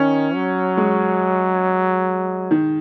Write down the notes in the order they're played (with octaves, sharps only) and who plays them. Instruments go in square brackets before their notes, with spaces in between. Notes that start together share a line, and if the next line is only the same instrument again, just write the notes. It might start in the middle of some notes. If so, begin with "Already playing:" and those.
Already playing: [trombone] D#3 [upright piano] C#4
[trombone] F#3
[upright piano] G#3
D#3